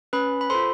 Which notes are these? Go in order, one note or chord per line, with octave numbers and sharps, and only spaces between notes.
C#4 B4 B5
B5
F4 A4 C5 C6